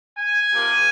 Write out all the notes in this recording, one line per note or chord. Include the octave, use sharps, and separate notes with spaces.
G#5
C3 F3 A#3